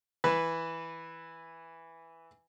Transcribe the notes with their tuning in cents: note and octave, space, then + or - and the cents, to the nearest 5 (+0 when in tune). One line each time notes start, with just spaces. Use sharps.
E3 +0 B4 +0